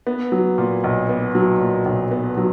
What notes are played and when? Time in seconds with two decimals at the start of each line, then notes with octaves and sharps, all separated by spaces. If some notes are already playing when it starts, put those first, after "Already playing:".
0.07 B3
0.32 F#3
0.58 A#2
0.84 B1
1.09 B3
1.35 F#3
1.61 A#2
1.86 B1
2.11 B3
2.37 F#3